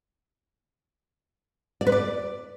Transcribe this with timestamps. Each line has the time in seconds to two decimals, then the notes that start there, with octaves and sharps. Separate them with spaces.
1.81 D5
1.87 B4
1.92 D5